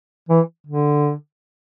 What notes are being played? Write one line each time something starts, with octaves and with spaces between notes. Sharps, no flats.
E3
D3